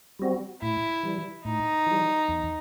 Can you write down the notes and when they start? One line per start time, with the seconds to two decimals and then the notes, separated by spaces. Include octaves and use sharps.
0.19 G3 C4 F#4
0.62 A2 E4
1.03 E3 G3
1.44 A2 D#4
1.86 E3 G3
2.28 E2